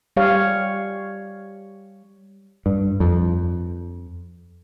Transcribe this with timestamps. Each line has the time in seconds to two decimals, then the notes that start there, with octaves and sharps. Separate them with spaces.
0.16 G3 G4 C#5 F5
2.66 G2
3.00 F2